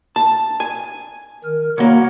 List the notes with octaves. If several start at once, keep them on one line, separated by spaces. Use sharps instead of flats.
A5
G#5
D#3 A#4
C2 A#3 F#4 C#5 F#5